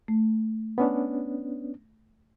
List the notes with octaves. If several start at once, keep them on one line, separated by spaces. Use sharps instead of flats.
A3
B3 C#4 D4